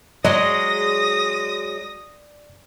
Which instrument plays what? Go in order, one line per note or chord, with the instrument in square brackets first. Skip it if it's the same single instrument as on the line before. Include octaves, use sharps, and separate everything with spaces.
[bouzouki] F#3 G#3 [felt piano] D5 [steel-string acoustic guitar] D#5 [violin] D#6 A#6